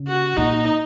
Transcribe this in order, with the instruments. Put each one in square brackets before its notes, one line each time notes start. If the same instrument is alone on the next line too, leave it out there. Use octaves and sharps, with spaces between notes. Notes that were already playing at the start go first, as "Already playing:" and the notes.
Already playing: [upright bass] C#3
[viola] F#4
[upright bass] A#2 [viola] D#4